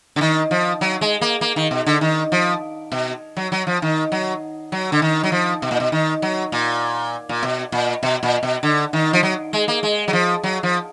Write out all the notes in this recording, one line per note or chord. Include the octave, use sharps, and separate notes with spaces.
D3
D#3
F3
F#3
G#3
A#3
A#3
D#3
B2
D3
D#3
F3
B2
F#3
F#3
F3
D#3
F#3
F#3
D3
D#3
F#3
F3
B2
A#2
B2
D#3
F#3
A#2
A#2
B2
A#2
B2
A#2
B2
D3
D#3
F3
F#3
G#3
A#3
G#3
F#3
F3
F#3
F3